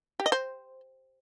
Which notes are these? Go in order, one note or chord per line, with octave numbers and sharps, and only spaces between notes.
G4
D#5
C5